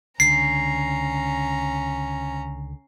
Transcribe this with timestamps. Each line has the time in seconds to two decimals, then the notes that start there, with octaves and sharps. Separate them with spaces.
0.20 C#2 D3 C#4 A#5 C7